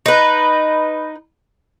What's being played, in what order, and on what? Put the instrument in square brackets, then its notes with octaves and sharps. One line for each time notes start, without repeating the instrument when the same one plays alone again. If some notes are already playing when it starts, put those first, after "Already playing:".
[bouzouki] D#4 B4